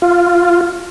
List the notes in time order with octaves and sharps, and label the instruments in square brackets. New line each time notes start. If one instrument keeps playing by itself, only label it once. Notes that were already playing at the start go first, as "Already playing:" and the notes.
[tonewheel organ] F4